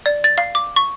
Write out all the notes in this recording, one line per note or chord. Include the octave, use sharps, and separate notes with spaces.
D5
A6
F5
D6
C#6